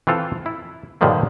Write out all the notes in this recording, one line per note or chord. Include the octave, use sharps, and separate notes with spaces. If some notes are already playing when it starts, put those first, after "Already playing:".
E3 C4 F4 A4
E4
G2 A#2 D3 D#3 F3 F#3